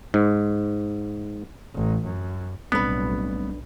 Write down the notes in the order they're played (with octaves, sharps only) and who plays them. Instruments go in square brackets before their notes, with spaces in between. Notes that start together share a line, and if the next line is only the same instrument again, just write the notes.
[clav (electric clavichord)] G#2
[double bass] A1
F#2
[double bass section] B1 A2 [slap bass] G3 A3 C4 [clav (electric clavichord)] B3 [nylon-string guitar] D4 B4